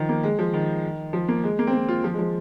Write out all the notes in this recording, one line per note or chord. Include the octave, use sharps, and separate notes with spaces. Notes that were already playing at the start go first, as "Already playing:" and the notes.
Already playing: D#3 F3
A#3
G#3
F3
D#3
F3
A#3
G#3
A#3
C4
A#3
F4
F3
G#3
F3